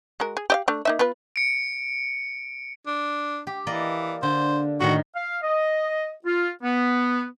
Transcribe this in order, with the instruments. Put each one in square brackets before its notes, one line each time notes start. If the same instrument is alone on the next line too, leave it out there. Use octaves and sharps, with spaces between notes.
[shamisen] G#3 F#4 A#4
G#4
G4 D#5 F5
A3 D4
A#3 D#4 E5
B3 F4 B4
[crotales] C#7 D7
[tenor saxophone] D4
[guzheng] G4
[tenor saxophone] E3 [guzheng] A#3 D5 D#5
[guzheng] D3 [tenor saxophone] C5
[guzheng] A2 D#3 [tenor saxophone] F#4
[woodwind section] F5
D#5
F4
B3